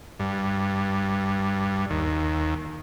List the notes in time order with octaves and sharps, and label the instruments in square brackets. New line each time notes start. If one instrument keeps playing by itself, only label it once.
[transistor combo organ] G2
D#2